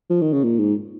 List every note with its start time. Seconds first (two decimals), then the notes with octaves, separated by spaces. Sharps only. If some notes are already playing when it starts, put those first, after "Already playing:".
0.10 F3
0.22 D#3
0.33 C#3
0.44 A#2
0.59 G#2